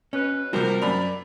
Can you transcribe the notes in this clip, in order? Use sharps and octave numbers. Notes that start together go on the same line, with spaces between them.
B2 C#4 B4
C3 F3 G3 F#4 A#4 C5
F#2 D5 B5 F7